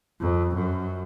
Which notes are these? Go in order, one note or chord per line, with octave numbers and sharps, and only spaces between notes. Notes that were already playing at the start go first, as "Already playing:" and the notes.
F2
F#2